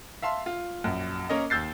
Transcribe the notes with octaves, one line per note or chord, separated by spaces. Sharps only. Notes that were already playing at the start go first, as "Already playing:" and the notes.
E5 F5 A5 C6
F4
A#1 F#2
A#3 C#4 A#4 D#5
D#2 E6 G6 A6 C7